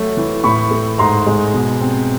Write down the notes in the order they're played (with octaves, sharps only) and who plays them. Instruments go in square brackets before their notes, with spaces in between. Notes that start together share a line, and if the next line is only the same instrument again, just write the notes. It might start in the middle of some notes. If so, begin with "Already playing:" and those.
Already playing: [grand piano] F#3 A3
E3
A2 B5 C#6
A3
G#2 A#5 C6
G#3
B2
C4